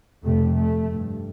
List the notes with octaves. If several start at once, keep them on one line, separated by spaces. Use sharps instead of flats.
F2 C3 A3
A3
G2